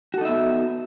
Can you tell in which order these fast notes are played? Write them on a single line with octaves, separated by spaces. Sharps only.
F#4 A4 D#4 E5 B3